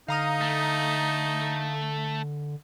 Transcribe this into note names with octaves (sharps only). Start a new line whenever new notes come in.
D3 D#4 F5 A#5 D#6
A3